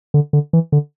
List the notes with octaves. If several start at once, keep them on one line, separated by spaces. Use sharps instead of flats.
D3
D3
E3
D3